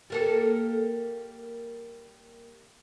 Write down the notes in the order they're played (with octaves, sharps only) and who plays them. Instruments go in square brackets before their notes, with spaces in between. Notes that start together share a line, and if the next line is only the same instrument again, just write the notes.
[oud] G3 A#3 A4